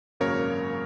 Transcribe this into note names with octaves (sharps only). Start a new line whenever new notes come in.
G#1 F#2 C#3 F#3 A#3 A#4 C#5